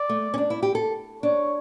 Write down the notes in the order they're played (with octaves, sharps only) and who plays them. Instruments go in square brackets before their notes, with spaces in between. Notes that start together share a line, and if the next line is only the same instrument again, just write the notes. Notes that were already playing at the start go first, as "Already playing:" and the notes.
Already playing: [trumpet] D5
[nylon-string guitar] A3
C#4
D4
E4
G4
A4
[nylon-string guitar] D4 [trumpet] C#5